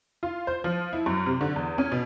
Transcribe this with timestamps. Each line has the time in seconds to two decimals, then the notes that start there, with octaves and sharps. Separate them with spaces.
0.23 F4
0.47 C5
0.64 F3
0.93 E4
1.06 F#2
1.26 C3
1.41 D3
1.56 E2
1.78 C#4
1.92 B2